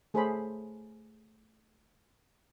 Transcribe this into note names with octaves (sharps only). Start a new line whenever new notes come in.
A3 G#4 A4 C5 C#5 B5